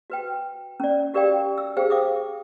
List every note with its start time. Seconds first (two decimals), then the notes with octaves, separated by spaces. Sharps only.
0.10 F#4 B4 G5
0.80 C#4 D5
1.14 F#4 G4 A#4 D5 F5 G5
1.58 E6
1.77 G4 G#4 C5 F5 G5
1.90 F5 D6 D#6